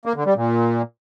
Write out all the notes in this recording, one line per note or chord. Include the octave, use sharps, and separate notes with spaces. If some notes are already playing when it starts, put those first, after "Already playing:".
A#3
D3
G3
A#2